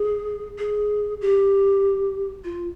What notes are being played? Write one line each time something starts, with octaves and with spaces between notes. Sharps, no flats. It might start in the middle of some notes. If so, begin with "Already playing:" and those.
Already playing: G#4
G#4
G4
F4